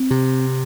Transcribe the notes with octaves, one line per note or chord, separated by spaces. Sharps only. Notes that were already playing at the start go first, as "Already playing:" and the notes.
Already playing: C4
C3